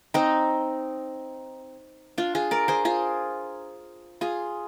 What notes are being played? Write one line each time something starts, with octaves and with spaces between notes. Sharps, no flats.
C4 D#4
D4 F4
F4 G#4
A#4 D5
G#4 C5
F4 G#4
F4 G#4